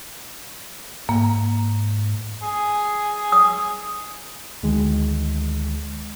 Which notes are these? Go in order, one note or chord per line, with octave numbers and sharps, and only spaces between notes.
G#2 A#3
G#4
D#6
D2 D#3 G#3